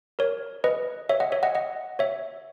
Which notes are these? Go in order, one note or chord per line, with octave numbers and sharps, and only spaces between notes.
A#4 C#5
B4 D#5
C#5 E5
D#5 F#5
C#5 E5
D#5 F#5
D#5 F#5
C#5 E5